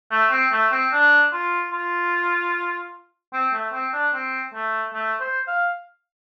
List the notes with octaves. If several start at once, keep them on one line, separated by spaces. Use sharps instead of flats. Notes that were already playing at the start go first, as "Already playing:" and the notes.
A3
C4
A3
C4
D4
F4
F4
C4
A3
C4
D4
C4
A3
A3
C5
F5